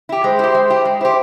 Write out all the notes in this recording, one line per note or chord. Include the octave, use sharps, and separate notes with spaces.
E4 G4
G#3 C5
E4 G4
G#3
E4 G4
G#3
E4 G4 C5